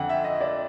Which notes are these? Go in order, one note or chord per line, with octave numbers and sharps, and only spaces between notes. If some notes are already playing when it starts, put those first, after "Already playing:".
Already playing: F2 D3 F#5 G5
E5
D#5
D5